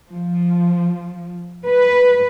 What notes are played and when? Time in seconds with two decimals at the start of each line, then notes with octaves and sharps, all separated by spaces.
0.11 F3
1.68 B4